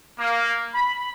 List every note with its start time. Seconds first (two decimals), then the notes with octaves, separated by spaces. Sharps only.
0.19 A#3
0.74 B5